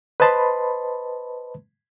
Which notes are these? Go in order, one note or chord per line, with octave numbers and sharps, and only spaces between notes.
B4 C5 D#5 A5 B5 C6